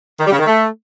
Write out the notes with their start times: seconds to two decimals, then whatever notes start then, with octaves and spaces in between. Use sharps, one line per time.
0.18 D#3
0.25 G3
0.32 C#3
0.39 D#3
0.46 A3